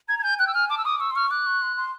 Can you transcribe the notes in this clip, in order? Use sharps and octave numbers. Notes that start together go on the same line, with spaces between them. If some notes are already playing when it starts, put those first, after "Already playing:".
A#5 G#6
G#6
G#5 G6
G5 F#6
E6
G#5 F6
A5 D6
E6
D6 D#6
C#6 E6
C6
C#6 F6
D6 F#6
C#6
C6
C6